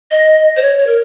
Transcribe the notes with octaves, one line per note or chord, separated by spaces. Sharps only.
D#5
C5
C#5
C#5
A#4